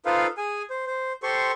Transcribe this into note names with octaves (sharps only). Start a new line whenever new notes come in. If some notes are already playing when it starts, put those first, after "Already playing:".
D#4 F4 A4 B4 C5 F5
G#4 G#5
C5
C5
G4 A4 C5 C6 C#6